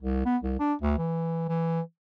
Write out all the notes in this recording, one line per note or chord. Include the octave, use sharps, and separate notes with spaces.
C2
B3
C2
D4
D2
E3
E3